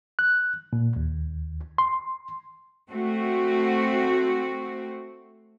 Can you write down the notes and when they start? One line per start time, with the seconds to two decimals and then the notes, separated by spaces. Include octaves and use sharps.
0.19 F#6
0.73 A#2
0.96 D#2
1.78 C6
2.89 A3 C4 F#4